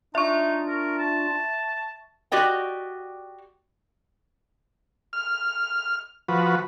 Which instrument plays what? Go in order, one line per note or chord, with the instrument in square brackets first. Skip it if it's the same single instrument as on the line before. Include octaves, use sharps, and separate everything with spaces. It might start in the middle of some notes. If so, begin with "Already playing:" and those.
[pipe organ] D4 F4 D5 [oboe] D#4 [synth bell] E5 C#6
[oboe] A#4
A5
[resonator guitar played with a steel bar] F#4 G4 D5 D#5 G5
[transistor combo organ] F6
F3 F#4 B4